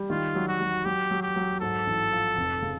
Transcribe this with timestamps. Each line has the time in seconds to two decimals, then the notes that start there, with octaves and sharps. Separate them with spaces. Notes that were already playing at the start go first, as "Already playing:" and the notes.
Already playing: G3
0.10 D#3 F4
0.35 F#3
0.48 F#4
0.61 F#3
0.85 F#3 G4
1.11 F#3
1.23 G4
1.36 F#3
1.61 G#2 A4
1.87 A1
2.12 F3
2.37 F1
2.62 C#3